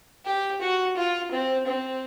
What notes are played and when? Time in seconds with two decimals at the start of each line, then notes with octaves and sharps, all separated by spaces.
0.26 G4
0.61 F#4
0.97 F4
1.32 C4
1.67 C4